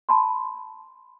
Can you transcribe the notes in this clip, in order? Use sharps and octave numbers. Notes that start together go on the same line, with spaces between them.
A5 B5 C6